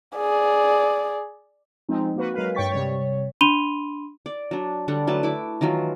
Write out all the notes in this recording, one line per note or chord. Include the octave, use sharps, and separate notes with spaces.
G#4 D5
F3 G#3 C4 D#4
A#3 F#4 B4
F#3 G#3 A#4 B4 F5
G2 C#5 G5 C#6 A6 B6
C3 G3 C#5
D4 B5 C6 D#7 F7 G7
D5
F#3 D4
D3 G3 D4 F#5
F#3 A3 B4 A5
E4 B5 D6
D#3 E3 F#3 F4